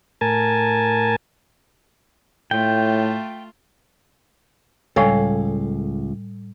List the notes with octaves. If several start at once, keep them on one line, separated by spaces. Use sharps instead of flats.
A2 A#4 G#5 A5
A2 A3 F4 G5
C#2 A2 G3 A4 C#5 F5 G#5